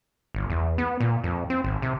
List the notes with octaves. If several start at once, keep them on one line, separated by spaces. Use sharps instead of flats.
G1
E2
B3
A#2
F2
C4
G#1
C3